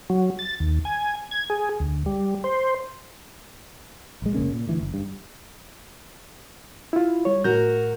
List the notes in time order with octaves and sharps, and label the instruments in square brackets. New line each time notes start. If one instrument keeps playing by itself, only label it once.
[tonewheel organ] F#3
A6
D#2
G#5
G#6
G#4
D2
G3
C5
[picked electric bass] A#1 G#3
F1 C#3 A#3 C#4
A#2
D2 E3
F#1
G2
[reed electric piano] E4 F4
G3 C#5
[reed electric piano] A2 G6 [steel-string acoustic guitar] F#4 A#4